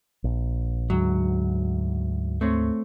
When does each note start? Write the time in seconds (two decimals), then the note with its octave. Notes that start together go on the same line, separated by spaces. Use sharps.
0.24 A#1
0.90 D2 G#2 F#3
2.41 A3 C4 C#5